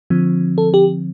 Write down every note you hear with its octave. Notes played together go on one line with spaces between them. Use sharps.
D3 F3 C4
A4
G4